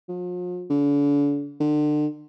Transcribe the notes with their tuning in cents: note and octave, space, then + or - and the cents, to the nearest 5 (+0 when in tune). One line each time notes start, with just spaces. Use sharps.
F3 +40
D3 -40
D3 +35